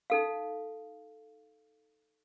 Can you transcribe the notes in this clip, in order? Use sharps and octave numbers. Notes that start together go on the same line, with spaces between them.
D#4 A4 F5